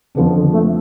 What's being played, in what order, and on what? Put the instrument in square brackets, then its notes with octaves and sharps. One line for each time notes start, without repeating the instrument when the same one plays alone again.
[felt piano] F2 F3 B3 D4 [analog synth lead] C#3
[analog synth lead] D3
A3